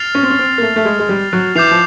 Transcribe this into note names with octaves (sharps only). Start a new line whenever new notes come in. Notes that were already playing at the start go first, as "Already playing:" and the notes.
Already playing: F6 A6 C7 F7
C#4
C4
C#4
C4
A#3
A3
A3
G#3
G#3
G3
F#3
E3 D6 G6 C7 F7
F3